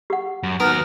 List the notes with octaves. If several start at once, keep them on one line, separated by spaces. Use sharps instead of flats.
G4 F#5
F#2
D#2 F#3 B3 D#4 A#4 F6